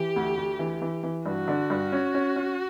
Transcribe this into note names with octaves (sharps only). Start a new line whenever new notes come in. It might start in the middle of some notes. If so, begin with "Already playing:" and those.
Already playing: E3 G4
D2
D2
E3
E3
E3
G2 F#4
D3
G2
C#4
C#4
C#4